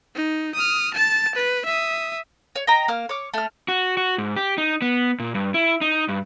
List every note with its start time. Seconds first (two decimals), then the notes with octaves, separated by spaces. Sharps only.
0.15 D#4
0.55 D#6 F6
0.94 A5 A6
1.35 B4
1.65 E5 D#6
2.56 C#5
2.67 D#5 G5 A#5
2.88 A#3 F6
3.09 C#5 D6 F6
3.34 A3 F6
3.68 F#4
3.97 F#4
4.18 G#2
4.36 G4
4.58 D#4
4.82 B3
5.19 A#2
5.35 G2
5.54 E4
5.81 D#4
6.09 G2